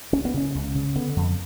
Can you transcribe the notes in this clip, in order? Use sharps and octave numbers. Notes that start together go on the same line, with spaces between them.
C#2 C#4
B3
C#3 C#4
C#2
C#3
D3 B3
F2